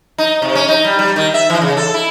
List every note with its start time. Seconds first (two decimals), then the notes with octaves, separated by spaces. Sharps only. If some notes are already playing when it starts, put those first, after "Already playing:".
0.18 D#4
0.42 C3
0.55 C#4
0.69 D#4
0.84 G3
0.99 G3
1.16 D#3
1.34 E5
1.50 E3
1.61 C#3
1.77 A4
1.94 E4